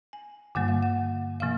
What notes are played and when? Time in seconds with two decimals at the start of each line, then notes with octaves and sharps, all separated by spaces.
0.13 G#5
0.55 G2 D3 G3 A#3 F#5
0.68 F5
0.82 F#5
1.40 C3 F3 A#3 F5